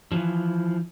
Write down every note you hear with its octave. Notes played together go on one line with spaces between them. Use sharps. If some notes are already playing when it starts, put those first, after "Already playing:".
E3 F3